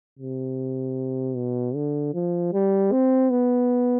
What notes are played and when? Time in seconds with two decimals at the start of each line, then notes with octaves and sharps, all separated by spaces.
0.19 C3
1.36 B2
1.75 D3
2.14 F3
2.53 G3
2.92 C4
3.30 B3